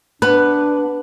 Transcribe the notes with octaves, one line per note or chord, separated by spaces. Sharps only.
B3 D4 B4